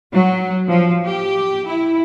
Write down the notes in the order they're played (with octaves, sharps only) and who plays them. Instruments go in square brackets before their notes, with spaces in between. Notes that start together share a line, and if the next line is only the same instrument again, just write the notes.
[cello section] F#3
F3
G4
E4